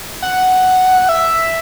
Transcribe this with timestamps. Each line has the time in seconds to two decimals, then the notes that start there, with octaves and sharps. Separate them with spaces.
0.22 F#5
1.09 E5